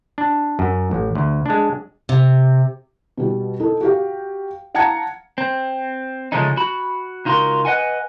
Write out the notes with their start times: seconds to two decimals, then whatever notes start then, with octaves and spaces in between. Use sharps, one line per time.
0.18 D4
0.59 F#2
0.91 A1
1.15 D2
1.46 G#3 D4
2.09 C3
3.17 B2 G3
3.60 D#4 A4
3.81 F#4 G4 F5
4.74 F5 F#5 A5 A#5 G#6 C#7
5.38 C4
6.32 C#3 F3 G#3 A3 C#4 D#4
6.57 F#4 B5
7.25 C#2 D#4 F4 F#4 A#4 C6
7.65 B4 D#5 F#5 G#5